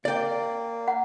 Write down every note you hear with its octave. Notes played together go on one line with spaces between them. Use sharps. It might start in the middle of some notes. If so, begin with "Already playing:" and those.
A#3 D5 G5
F#5